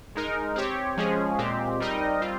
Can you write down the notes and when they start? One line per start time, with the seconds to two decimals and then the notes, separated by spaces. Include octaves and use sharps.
0.15 G#3 D#4 A#4
0.56 C4 G4 C#5
0.97 F3 G#3 C#4 G#4
1.38 A#2 G#3 C4 G4
1.80 G3 C4 D#4 A#4 D#5
2.21 G3 C4 F4